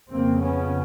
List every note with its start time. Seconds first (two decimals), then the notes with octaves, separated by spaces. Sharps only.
0.11 F2 C#3 A#3 C4
0.41 B3 C#4